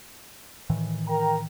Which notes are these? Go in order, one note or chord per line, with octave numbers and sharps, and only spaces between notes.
A2 D#3 E3
A#4 G5 A#5